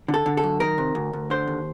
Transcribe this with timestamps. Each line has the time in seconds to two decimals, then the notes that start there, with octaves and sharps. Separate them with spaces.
0.08 D3
0.14 A4
0.26 D3
0.37 A4
0.43 F#2
0.60 D#3 A#4
0.78 C3
0.95 D2
1.13 D2
1.30 D3 C5
1.47 D#2